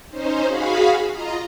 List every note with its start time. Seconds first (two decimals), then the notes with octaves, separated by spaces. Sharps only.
0.10 C#4 D#4 C5
0.46 F#4 G#4 F5 B5
1.12 F4 D#5 A#5